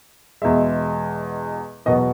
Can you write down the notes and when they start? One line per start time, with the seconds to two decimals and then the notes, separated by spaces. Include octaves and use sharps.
0.42 E2 B2 G#3 E5
1.86 E2 B2 F#3 B3 D#5